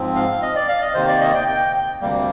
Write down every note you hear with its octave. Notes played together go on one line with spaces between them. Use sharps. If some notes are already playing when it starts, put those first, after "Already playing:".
Already playing: G#2 F3 C4
F5
D#5
D5
F5
D#5
C3 D#3 A#3 C5
D5
D#5
G5
G5
D2 C3 G3 A#3